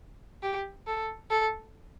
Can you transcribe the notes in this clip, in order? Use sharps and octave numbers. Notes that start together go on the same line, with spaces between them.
G4
A4
A4